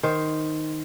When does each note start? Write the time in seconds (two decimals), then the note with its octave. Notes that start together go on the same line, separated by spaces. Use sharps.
0.03 D#3 C5